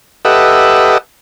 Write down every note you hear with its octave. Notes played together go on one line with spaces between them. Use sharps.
G4 A4 B4 D#5 E5 F#5